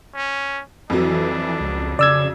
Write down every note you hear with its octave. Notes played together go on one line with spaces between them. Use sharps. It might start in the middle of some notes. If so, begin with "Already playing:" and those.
C#4
F2 E3 F#3 D4
C#2
C#3 D5 E6 G#6